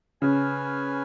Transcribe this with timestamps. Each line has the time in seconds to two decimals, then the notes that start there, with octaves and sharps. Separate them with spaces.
0.21 C#3 C#4 B4 G#5